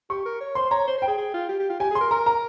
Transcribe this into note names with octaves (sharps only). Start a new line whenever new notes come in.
G4 C#6
A#4
C#5
C5 C6
C#5 A#5
C5
C5 G5
G#4
G#4
F4
G4
G4
F4
G4 G#5
G#4 C6
A#4
A#4 A#5
A#5